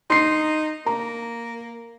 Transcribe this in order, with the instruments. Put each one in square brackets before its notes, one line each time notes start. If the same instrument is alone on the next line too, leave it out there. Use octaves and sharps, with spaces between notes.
[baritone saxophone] D#4 [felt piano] C6 C7
[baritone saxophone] A#3 [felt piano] A#5